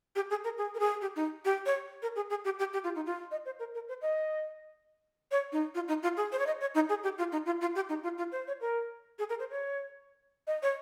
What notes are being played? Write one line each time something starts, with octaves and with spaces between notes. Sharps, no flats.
G4
G#4
A#4
G#4
A#4
G#4
G4
D#4
G4
C#5
A#4
G#4
G#4
G4
G4
G4
F4
D#4
F4
D#5
C5
A#4
A#4
C5
D#5
C#5
D#4
F4
D#4
F4
G#4
C5
C#5
D#5
C#5
D#4
G#4
G4
F4
D#4
F4
F4
G4
D#4
F4
F4
C5
C#5
A#4
G#4
A#4
C5
C#5
D#5
C#5